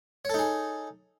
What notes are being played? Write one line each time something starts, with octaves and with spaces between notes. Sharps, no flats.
D#4 G#4 A4 C#5